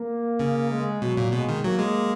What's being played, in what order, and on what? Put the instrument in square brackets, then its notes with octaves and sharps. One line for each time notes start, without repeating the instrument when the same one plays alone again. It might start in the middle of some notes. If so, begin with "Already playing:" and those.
Already playing: [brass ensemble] A#3
[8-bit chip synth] C#3
[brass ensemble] G#3
[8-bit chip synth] B2 [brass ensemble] F#3
[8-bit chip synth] A#2
[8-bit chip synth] B2 [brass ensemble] G#3
[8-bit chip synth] D#3
[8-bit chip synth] F#3 [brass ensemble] A#3
[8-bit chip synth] G#3